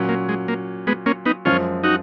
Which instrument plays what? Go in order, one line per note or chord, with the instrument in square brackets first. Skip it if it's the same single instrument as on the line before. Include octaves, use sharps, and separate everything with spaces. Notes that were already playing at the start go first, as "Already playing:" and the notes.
Already playing: [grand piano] A#2 F#3 C#4
[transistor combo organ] A#3
G#3
A#3
G#3 B3
A#3 C#4
B3 D#4
[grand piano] F#2 F3 G#3 [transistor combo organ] C#4 F4
[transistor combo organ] D#4 F#4